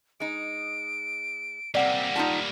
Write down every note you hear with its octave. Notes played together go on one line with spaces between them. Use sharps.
G#3 D#4 D7
C3 G3 A#3 C4 D5 F#5 B6
D#4 F4 A5